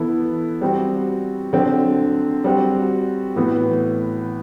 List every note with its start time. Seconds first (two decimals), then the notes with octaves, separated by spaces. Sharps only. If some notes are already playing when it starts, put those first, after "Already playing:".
Already playing: E3 B3 E4 A4
0.61 G3 C4 F#4
1.53 D3 F#3 C4
2.44 G3 C4 F#4
3.36 A2 E3 B3